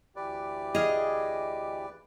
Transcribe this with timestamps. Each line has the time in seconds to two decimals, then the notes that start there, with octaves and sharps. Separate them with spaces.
0.16 D2 E3 G4 B4 D5
0.75 G#4 D#5 F5